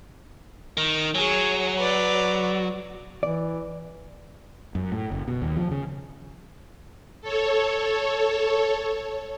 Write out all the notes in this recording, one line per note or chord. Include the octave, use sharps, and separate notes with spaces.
D#3
F#3 G#4 C#5
B4 D5
E3 D5
F#2
A2
F#1
B2
D#2
F3
C#3
A4 C#5